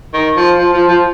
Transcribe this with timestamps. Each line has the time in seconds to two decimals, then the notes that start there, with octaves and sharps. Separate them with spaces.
0.14 D#3
0.36 F3
0.59 F3
0.74 F3
0.89 F3